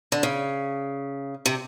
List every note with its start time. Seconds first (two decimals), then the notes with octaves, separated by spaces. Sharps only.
0.12 D3
0.23 C#3
1.46 C3